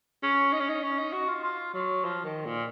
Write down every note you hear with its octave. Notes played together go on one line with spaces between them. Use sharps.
C#4
D#4
C#4
D#4
C#4
D#4
F#4
F4
F4
F#3
F3
D#3
A#2